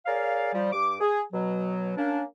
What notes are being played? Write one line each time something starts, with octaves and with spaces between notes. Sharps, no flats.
G#4 A#4 C#5 D5 F5
F3 G3
G2 D6
G#4
B2 F#3
A#3 C#4 D4